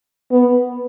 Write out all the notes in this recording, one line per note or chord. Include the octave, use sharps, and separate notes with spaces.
B3